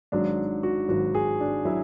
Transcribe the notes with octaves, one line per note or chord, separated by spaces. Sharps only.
G#1 G#2 F#3 D4
F#4
G#1 G#2 F#3 F#4
G#4
D4
F#3 E4